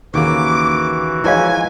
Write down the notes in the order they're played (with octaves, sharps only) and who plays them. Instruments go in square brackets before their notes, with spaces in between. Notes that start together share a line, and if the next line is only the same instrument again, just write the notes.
[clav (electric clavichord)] D#2 C#3 A#3 [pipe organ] E3 F#4 [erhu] D6
[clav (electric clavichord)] F3 G#3 [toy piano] E4 C#5 F5 [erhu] G#5